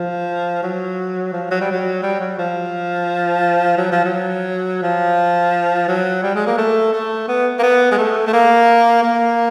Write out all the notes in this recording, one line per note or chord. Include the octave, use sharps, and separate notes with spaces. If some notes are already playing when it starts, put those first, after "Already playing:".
Already playing: F3
F#3
F3
F#3
G3
F#3
G3
F#3
F3
F#3
F3
F#3
F3
F#3
G3
G#3
A#3
A3
A3
B3
A#3
B3
G#3
A3
A3
A#3
A#3